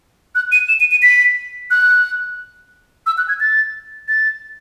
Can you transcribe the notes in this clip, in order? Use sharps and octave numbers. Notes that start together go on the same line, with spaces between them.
F#6
D#7
E7
D#7
D#7
B6
F#6
E6
F#6
G#6
A6
A6